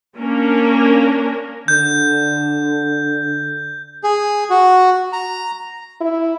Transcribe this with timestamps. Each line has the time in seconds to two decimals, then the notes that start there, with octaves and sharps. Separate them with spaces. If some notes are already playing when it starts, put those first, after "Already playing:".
0.17 A#3 C#4 D4 A#4
1.68 D3 G6
4.04 G#4
4.50 F#4
5.13 A#5
6.01 E4